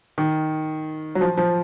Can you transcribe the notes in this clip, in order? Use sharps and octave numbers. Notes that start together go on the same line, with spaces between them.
D#3
F#3
F3
F3